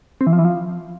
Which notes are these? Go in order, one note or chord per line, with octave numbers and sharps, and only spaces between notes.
C4
E3
F3
E3
F3